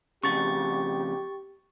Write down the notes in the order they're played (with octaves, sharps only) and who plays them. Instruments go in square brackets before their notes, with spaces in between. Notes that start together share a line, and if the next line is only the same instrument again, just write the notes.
[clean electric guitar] F2 A2 C#3 [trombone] G4 [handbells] C#6 A6